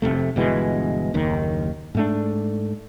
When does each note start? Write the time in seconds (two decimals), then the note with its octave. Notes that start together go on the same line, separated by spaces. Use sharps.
0.02 F1 F2 C3 A3
0.36 G1 B2 E3 G#3
1.14 F#1 D#2 D#3
1.95 G#2 A3 D4